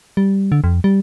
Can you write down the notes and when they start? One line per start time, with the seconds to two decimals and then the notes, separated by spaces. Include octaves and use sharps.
0.17 G3
0.52 D3
0.64 F2
0.84 G3